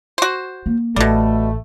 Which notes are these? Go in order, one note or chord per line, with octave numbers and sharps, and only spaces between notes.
F#4 C5
A#3
A1 B2 G3 A3